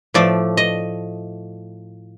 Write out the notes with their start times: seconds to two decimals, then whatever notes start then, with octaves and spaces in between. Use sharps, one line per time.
0.14 A2 F3 A3 D5
0.57 D#5